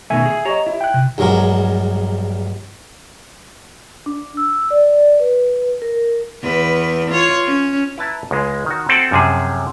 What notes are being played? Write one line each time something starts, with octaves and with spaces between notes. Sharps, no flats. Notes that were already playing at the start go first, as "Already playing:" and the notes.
B2 D#3 A3 E5 G#5
G#4
G4 C#5 D#5 A#5
E4
G5 F#6
C3
A#1 G2 F#3 G#3 A#4
D4
E6
D5
B4
A#4
E2 B4
F4 C#5
C#4
E4 B4 A5 A#5
C#2 G#3
D#3 F#4
C4 F#4 A4 F#5 G5 A5
F#2 C3 F3 G#4